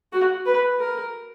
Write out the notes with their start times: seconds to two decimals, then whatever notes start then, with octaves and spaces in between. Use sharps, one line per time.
0.13 F#4
0.46 B4
0.80 A#4